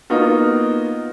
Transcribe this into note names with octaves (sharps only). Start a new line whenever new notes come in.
A#3 B3 D#4 F4 F#4